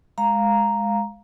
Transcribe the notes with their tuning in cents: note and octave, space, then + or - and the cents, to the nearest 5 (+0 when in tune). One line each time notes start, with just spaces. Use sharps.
G#3 +0 F5 +0 A#5 +0